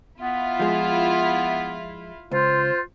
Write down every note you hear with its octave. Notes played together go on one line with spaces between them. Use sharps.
B3 E4 F4
F3 G#3
C#2 F4 C5